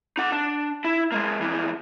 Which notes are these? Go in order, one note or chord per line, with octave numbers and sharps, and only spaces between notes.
D#4 F#5
D4
E4
G#3 A#3
F2 E3